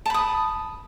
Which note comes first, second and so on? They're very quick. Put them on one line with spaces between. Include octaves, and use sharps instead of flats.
A5 B5 D#6